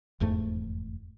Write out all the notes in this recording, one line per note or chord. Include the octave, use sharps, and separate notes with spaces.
F1 E2 G#2 A3